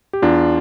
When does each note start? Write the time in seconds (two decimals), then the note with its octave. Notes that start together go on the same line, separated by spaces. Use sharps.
0.13 G4
0.22 E2 D4 F4